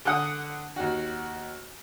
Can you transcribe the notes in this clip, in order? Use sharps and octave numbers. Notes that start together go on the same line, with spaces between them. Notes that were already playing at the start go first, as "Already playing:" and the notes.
D3 F#5 D#6
D#2 F#4